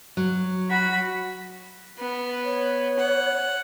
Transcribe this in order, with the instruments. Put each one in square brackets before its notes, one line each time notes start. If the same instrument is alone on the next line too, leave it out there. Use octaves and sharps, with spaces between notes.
[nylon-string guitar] F#3
[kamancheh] F#4 B5
[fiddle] B3
[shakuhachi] C#5
[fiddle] F#5